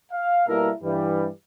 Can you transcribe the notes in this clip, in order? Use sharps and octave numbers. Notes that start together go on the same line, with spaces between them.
F5
B2 G3 A#3 E4 A4 A#4
G2 E3 G3